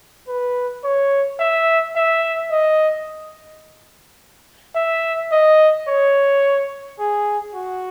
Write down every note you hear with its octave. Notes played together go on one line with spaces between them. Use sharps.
B4
C#5
E5
E5
D#5
E5
D#5
C#5
G#4
F#4